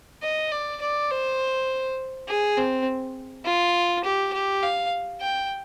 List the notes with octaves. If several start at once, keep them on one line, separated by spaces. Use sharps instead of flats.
D#5
D5
D5
C5
G#4
C4
F4
G4
G4
F5
G5